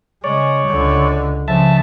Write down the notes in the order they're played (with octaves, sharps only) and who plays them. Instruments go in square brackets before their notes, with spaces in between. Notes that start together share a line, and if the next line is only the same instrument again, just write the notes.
[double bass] C#3 G#3 [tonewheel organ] C#5 D5
[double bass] C#2 D3
[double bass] C#3 [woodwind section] F3 [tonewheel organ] E5 A5